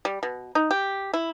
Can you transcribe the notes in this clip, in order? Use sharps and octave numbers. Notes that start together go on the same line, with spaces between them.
G3
B2
D#4
G4
E4